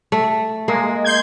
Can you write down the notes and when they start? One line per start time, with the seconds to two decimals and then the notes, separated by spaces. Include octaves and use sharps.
0.12 A3
0.68 G#3 A#3
1.05 C6 G6 G#6